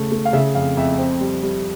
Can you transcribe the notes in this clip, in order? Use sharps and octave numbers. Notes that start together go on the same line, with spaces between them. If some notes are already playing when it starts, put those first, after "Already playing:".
Already playing: C#3 A3
A3
F5
C#3 E5
F2 F5
F2 E5
C4
G3
G3